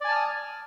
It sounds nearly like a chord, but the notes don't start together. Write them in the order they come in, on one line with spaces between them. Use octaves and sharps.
D5 G#5 A5 F6 D#6